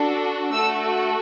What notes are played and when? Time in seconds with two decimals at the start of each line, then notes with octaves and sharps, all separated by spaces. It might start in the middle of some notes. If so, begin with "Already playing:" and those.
Already playing: D4 F#4 A4
0.53 A3 F#4 A4 E6